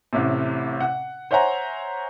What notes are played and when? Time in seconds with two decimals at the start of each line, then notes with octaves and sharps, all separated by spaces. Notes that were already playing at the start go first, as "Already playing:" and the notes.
0.13 A1 A2 C3
0.81 F#5
1.31 C5 C#5 E5 F#5 G#5 A#5